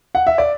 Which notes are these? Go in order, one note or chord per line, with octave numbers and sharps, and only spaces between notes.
F#5
E5
D5